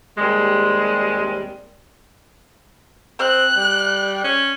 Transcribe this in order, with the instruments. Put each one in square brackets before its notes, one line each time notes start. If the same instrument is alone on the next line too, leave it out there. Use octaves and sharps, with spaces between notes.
[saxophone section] D#2 C3 G3 G#3
[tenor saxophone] C4 [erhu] F#6
[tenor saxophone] G3
C#4